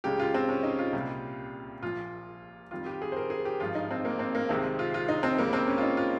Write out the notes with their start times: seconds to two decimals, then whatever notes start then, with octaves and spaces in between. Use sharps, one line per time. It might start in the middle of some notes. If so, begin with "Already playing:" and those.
0.04 C#2 C#3 G#3 G4
0.20 F4
0.34 C4
0.49 C#4
0.63 D#4
0.79 F4
0.93 C2 A#2 G3
1.83 A#1 A#2 F3 F4
2.71 F2 D#3 G3 F4
2.86 G4
3.02 G#4
3.12 C5
3.16 A#4
3.30 G#4
3.45 G4
3.60 G#1 G2 F3 G#3 F4
3.75 D#4
3.91 C4
4.05 A#3
4.19 C4
4.35 A#3
4.49 C2 C3 D#3 G#3 C4
4.79 F4
4.94 F4
5.08 D#4
5.23 C4
5.38 C#2 C#3 G3 A#3
5.53 C4
5.68 C#4
5.78 F4
5.83 D#4
5.97 F4